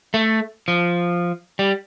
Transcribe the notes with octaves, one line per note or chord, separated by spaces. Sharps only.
A3
F3
G3